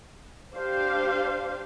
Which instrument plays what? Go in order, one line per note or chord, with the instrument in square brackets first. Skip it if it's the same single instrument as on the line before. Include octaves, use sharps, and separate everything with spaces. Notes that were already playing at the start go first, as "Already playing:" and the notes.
[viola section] D4 G4 C5 F5